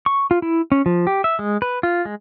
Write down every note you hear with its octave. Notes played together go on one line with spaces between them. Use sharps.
C#6
F4
E4
C#4
F3
G4
E5
G#3
B4
F4
G#3